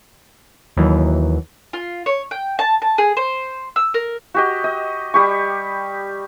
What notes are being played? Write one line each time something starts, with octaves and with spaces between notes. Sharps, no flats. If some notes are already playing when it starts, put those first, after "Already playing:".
D#2 E3 F#3
F4
C#5
G5
A5
A5
G#4
C5
E6
A#4
F#4 G4 D#5
D#5
G3 G4 C#6